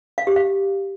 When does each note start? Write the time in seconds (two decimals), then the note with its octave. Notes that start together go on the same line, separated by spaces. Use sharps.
0.18 F5
0.27 G4
0.36 F5